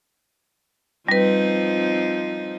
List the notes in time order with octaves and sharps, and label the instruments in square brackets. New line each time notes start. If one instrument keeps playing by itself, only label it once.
[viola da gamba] F3 C4 D#4 [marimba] G3 B4